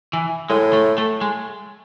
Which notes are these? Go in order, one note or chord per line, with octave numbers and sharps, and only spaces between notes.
E3
A2 G#3
A3
A3
G#3